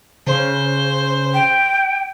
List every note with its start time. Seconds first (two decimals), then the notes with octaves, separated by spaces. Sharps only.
0.27 C#3 C5
1.34 G5